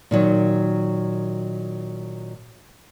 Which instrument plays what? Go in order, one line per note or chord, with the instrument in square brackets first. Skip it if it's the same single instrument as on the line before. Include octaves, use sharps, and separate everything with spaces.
[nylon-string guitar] A#2 D#3 F#3